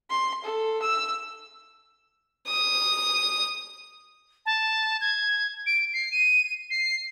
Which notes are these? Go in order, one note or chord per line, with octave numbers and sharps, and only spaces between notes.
C6
A4
E6
D#6
A5
G#6
D7
C7
D#7
C7